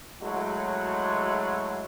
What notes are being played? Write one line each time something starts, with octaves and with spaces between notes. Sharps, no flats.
F#3 G#3 A3 E4 F#4